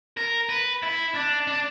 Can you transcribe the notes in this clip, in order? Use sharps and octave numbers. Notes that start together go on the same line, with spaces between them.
A#4
B4
E4
D4
D4